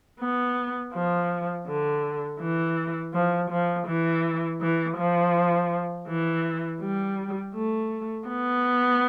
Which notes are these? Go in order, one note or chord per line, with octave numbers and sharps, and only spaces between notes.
B3
F3
D3
E3
F3
F3
E3
E3
F3
E3
G3
A3
B3